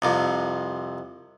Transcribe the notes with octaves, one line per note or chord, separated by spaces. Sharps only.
C2 F2 C3